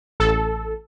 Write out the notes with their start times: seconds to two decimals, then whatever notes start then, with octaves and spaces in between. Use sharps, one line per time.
0.20 A1 A4